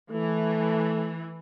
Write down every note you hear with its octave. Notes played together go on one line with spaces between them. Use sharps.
E3 A3